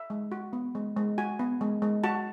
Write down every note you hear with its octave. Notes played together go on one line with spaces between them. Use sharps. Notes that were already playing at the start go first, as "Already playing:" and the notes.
Already playing: E5
G#3
F#4
B3
G#3
G#3
F#4 G#5
B3
G#3
G#3
F#4 A5